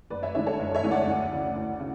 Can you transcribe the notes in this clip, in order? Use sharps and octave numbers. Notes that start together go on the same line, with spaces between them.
F#1 B4 D5
C#5 E5
E2 D3 G#3 D4 C#5 E5
A4 C#5
F#1
C#5 E5
E2 D3 G#3 D4
D5 F#5
D2
C#3 E3
D2
C#3